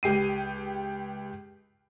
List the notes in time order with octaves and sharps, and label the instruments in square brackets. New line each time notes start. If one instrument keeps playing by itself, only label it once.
[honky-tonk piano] C#2 G4 C7 D#7